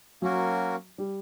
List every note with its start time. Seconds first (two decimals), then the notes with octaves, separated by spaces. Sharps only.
0.22 F#3 A#3 C#4 F#4 A#4
0.98 G3